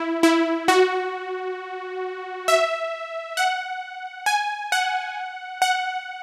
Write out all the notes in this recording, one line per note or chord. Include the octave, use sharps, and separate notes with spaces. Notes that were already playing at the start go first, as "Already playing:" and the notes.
Already playing: E4
E4
F#4
E5
F#5
G#5
F#5
F#5